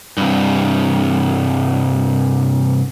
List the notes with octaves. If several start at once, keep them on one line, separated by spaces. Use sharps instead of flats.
C2 G2